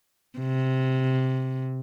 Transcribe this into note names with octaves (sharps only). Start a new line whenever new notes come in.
C3